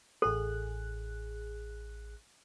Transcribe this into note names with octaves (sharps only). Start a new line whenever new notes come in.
A1 G#4 A4 F#6